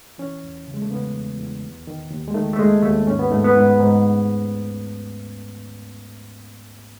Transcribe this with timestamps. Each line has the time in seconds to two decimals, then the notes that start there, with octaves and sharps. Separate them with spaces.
0.18 E3 C#4
0.44 E2
0.67 C#3
0.74 G#3
0.82 A3
0.90 C#3 B3
1.15 E2
1.39 E2
1.63 D#2
1.87 D#3
2.11 D#2
2.28 G#3
2.34 D#3 A3
2.53 A3
2.59 D#2 G#3
2.82 D#2 A3
3.07 G#2 C#4
3.19 B3
3.31 G#2 A3
3.44 B3
3.56 G#2
3.80 G#2